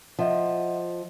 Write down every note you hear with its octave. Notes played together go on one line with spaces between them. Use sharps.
F3 D#5 E5 F#5